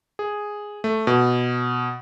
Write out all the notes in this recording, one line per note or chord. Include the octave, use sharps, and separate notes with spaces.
G#4
A3
B2